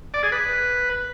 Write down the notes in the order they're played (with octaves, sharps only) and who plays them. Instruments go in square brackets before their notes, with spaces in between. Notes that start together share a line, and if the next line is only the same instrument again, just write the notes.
[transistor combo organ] D5
G#4
B4